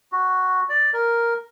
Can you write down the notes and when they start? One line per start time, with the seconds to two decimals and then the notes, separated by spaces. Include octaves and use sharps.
0.12 F#4
0.69 D5
0.94 A#4